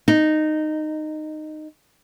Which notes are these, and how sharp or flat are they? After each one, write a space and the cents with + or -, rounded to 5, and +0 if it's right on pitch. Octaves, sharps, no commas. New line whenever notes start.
D#4 -15